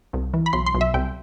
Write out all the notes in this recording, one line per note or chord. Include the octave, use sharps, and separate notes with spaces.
C2
E3
B5
B1 C6
C6
B1
E5
C2 G5